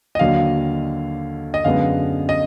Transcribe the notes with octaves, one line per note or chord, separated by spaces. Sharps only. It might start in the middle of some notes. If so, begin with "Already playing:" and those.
D#5
D#2 D3 F#3 F5
D#5
F#2 D3 G#3 B3 F5
D#5